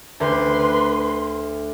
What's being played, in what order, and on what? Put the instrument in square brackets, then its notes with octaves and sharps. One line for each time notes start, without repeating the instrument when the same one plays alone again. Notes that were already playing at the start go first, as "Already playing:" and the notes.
[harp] D2 G4 [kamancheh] B4 C6